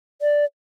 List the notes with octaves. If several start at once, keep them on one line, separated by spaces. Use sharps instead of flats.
D5